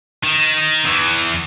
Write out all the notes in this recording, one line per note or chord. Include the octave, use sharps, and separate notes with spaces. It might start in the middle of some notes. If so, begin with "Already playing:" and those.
D#3
E2 E3